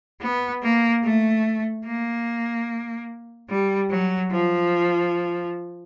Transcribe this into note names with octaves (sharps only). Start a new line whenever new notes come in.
B3
A#3
A3
A#3
G3
F#3
F3